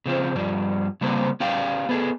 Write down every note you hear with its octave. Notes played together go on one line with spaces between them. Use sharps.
C#3 F3 C4
G2 F3 G3
C#3 G3 A#3 C4 C5
C#4 G4 F5 G5
B3 G#4 A4